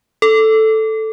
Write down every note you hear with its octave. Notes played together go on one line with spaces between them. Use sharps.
A4